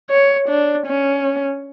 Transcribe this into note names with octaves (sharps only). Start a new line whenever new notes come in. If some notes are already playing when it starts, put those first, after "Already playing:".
C#5
D4
C#4